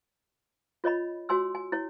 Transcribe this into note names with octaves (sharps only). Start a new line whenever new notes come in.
F4 C#5 D#5 B5
F#4 C#5 G#5 C6 E6
G#5
E4 C#5